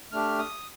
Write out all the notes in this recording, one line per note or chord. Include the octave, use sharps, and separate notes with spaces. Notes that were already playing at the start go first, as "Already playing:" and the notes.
A3 D4 G4 F6
D#6